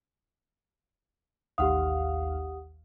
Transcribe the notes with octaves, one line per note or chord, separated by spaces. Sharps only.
A1 D#2 G4 F5 F#5 D#6